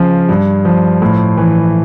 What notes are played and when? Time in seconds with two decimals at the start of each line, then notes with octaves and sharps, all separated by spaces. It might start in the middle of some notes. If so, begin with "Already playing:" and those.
Already playing: C#3 F3
0.29 G2
0.65 F3
1.02 A2
1.37 E3